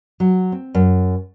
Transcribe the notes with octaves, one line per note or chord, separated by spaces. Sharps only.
F#3
C4
F#2